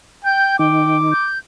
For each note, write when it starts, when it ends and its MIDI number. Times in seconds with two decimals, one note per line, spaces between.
0.25 0.56 79
0.25 0.56 91
0.59 1.13 51
0.59 1.13 63
0.59 0.97 79
0.59 1.29 86
1.12 1.39 91